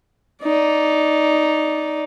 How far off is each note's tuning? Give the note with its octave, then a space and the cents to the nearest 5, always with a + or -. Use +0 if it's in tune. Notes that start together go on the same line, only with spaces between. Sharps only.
D#4 +0 D5 -10